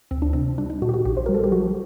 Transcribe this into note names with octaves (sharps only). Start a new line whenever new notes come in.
D2 C4
D4
C3 C4
G3 D4
D#4
A#2 F#4
G4
F#4
A#1 G4
C5
G3 A#4
A4
G4
F#3 F#4